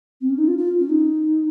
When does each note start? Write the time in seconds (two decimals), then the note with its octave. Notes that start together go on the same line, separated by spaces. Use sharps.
0.21 C4
0.30 C#4
0.38 D#4
0.48 F4
0.58 F4
0.79 C#4
0.89 D#4